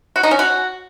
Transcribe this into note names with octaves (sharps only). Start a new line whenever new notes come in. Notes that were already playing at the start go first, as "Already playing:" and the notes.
F#4
D#4
C#4
F#4